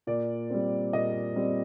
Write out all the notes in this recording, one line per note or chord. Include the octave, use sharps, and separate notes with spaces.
A#2 D5
G3 C4
A#2 D#5
G3 C4